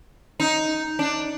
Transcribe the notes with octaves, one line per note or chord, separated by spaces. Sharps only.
D#4
D4